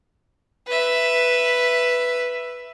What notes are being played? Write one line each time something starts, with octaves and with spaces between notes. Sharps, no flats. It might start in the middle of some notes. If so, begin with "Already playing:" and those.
B4 E5